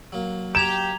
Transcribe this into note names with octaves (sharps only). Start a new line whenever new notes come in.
F#3 A#3
G4 A#5 G#6 E7 F7